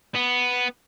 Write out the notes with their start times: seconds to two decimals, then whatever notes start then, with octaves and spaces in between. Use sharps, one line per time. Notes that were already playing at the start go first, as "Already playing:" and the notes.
0.15 B3